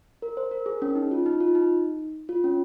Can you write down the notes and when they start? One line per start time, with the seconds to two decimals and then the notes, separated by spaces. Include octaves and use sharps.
0.22 A#4
0.37 C5
0.51 A#4
0.66 G#4
0.82 C#4
0.95 D#4
1.11 F4
1.26 D#4
1.40 F4
1.55 D#4
2.29 F4
2.44 C#4